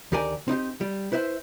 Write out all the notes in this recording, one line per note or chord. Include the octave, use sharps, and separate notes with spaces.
D2 D#3 G4 A#4 D5 G#5
C4 D#4 F4 G4
G3
E4 B4 C5 D#5 E5